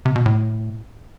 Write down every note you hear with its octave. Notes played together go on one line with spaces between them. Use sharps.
C3
B2
A2